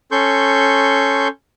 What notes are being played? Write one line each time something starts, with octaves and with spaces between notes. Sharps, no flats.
C#4 A4 C6 C#6 G6